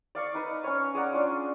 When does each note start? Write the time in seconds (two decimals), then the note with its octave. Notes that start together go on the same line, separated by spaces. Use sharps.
0.15 D5 F5 C#6
0.35 D#4 B4
0.64 C#4 C#5
0.95 G#4 D5 F#5 A#5
1.13 C#4 D4 F4